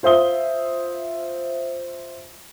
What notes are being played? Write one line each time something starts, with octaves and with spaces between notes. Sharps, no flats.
F4 C5 E5 D#6 G7